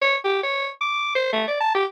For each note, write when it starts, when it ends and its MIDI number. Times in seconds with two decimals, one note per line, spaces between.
0.02 0.16 73
0.24 0.38 67
0.43 0.69 73
0.81 1.14 86
1.15 1.28 72
1.33 1.47 57
1.48 1.59 74
1.60 1.75 81
1.75 1.85 67